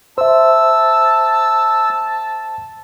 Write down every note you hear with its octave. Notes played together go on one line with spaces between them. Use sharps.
C5 E5 A5 E6